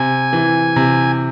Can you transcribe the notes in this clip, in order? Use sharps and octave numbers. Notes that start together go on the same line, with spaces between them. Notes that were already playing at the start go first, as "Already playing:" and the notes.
Already playing: C3 G#5
E3
C3